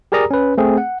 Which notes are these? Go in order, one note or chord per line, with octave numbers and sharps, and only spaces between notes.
G4 G#4 A#4 D5 A#5 D#6
C#4 B4
A3 C4 G#4
F#5